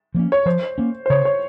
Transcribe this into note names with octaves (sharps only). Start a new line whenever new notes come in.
F3 A#3 C#4
C#5
F3 C5
A#3 C#4
C5
C#3 C#5
C#5